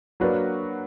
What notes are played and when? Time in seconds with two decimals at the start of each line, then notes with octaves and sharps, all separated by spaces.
0.20 F#3 A#3 D4 F#4 B4